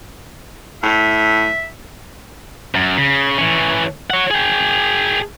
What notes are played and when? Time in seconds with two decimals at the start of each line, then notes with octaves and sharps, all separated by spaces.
0.83 A2 E5
2.75 F#2
2.98 C#3
3.38 E3 C#4
4.10 C#5 F#5
4.31 G#4 G5